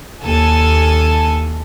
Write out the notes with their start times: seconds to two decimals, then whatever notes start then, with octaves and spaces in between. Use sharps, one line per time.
0.23 D#2 A4 G#5 A5